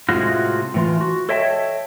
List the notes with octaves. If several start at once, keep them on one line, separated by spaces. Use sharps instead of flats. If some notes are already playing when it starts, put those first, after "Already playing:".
A2 C3 G#3 A3 F4 F#4
A2 E3 F4
F#4
A4 C#5 D#5 E5 G5 A5